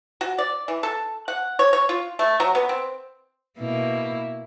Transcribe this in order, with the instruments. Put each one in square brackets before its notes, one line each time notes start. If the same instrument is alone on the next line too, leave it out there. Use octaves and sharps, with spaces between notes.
[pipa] F#4
D5
E3
A4
F#5
C#5
C#5
F4
A3
F#3
B3
C4
[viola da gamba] B2 A#3 E4